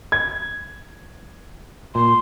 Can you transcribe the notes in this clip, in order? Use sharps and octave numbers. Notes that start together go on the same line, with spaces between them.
G#6
A#2 C6